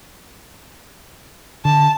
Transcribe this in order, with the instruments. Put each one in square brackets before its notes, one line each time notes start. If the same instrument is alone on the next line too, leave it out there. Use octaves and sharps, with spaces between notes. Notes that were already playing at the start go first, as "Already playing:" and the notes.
[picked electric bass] D3 [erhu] A5